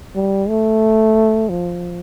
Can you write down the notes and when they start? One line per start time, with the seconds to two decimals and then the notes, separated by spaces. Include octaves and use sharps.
0.15 G3
0.49 A3
1.49 F3